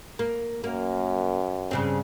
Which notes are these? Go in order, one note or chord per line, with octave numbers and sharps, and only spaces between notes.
A#3
F#2 A#3
G2 C#3 C4